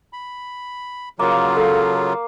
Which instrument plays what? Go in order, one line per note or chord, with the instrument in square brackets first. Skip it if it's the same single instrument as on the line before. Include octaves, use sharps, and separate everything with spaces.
[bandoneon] B5
[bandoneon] C#3 F#3 F4 [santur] A#3 F#5
[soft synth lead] A4 [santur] F5